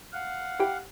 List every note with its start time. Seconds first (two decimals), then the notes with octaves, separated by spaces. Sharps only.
0.13 F5 F#5
0.59 E4 G4 G5